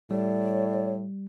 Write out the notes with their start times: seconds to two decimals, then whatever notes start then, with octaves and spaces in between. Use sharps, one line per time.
0.11 A2 G3 C#5 D5